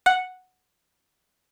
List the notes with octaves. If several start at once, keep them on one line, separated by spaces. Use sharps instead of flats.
F#5